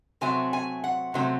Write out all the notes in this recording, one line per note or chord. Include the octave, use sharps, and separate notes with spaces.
C3 F#3 A3 C4 G#5
G#5
F#5
C3 F#3 A3 C4